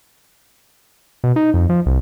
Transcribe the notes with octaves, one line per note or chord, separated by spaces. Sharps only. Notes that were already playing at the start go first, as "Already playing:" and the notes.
B2
D#4
F2
F3
C2